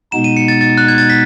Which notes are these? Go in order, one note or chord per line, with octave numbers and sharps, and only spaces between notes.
B2 G#3 B3 D#4 E7
D#7
C#7
A6
A6
F#6
G#6
A6
B6